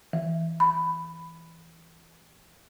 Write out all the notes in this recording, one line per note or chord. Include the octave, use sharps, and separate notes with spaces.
E3
B5